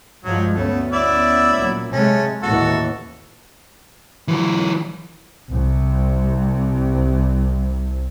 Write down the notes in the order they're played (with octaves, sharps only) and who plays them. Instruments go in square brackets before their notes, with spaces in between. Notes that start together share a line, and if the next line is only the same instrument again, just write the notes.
[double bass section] G2 F3 G#3 [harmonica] F#3
[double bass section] D2 B3 C#4 [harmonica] A3
[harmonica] E4 D5 E5
[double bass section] A#2 F#3
[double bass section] C3 G#3 [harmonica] A3 C#4
[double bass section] A1 D#2 E3 [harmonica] F#4 A4
[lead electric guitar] E3 F#3
[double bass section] C2 C3